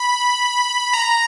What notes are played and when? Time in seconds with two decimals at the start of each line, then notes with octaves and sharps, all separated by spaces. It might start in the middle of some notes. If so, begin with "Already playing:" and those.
Already playing: B5
0.94 A#5